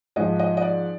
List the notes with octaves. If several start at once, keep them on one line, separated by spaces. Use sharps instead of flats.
G#2 F3 D#5
D#5
D#5
D5